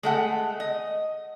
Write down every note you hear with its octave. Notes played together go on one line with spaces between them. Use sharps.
G#3 A3 F#5
D#5